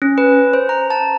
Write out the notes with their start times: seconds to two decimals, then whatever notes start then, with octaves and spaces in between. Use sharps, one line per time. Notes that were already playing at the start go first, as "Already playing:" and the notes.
0.02 C#4
0.18 B4
0.53 C5
0.69 A#5
0.90 A5